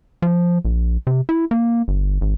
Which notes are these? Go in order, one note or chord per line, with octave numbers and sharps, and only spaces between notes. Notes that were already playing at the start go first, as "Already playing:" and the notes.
F3
A#1
C3
E4
A#3
G1
G#1